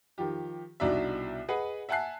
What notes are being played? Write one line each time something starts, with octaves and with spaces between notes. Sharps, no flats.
D#3 F3 G4
C2 B2 D4 D#4 F#4 E5
G#4 B4 D#5 F#5
E5 F#5 G#5 A5 F#6 C7